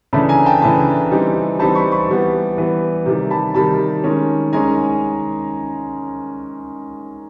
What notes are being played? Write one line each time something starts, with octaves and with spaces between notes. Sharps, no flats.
C#3 E3 A3 D4 A5 B5
G#5 A#5
G5 A5
C#3 E3 A3 D4 A5 B5
E3 G3 C4 D#4
E3 G3 C4 D#4 A5 B5
B5 C#6
B5 C#6
E3 G3 B3
E3 G3 B3
C3 D#3 G3
A5 B5
C3 D#3 G3 A5 B5
D#3 G#3 C#4
D#3 G#3 C#4 G#5 A#5